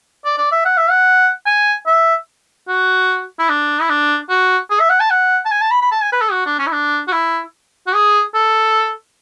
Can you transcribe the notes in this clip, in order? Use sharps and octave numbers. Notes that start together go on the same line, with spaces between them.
D5
D5
E5
F#5
E5
F#5
G#5
E5
F#4
E4
D4
E4
D4
F#4
G#4
E5
F#5
A5
F#5
A5
G#5
A5
B5
B5
A5
G#5
B4
A4
F#4
D4
C#4
E4
D4
F#4
E4
F#4
G#4
A4